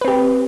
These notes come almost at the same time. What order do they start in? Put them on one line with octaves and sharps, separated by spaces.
B4 C4 G4